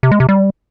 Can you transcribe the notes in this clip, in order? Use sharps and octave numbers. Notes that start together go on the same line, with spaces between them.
C3
G#3
C3
G3